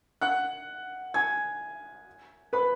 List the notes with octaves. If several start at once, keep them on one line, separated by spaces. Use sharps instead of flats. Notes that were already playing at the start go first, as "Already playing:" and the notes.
F#5 F#6
G#5 G#6
B4 B5